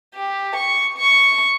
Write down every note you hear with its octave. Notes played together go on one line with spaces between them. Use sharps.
G4
C#6
C#6